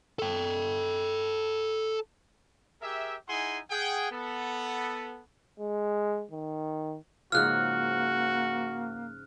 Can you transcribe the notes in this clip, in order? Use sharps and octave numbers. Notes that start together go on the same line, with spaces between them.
A4 G5
G4 G#4 A#4 E5
D#4 E4 G#4 F#5 G#5 C6
G#4 F#5 G5
B3 A4
G#3
D#3
G#2 C#3 F3 A#3 F#4 F6 F#6